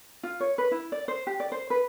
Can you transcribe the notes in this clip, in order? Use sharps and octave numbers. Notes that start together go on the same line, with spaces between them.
F4
C#5
B4
E4
D5
C5
G4
D5
C5
B4